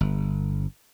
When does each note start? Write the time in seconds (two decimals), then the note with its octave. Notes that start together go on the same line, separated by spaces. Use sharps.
0.01 G1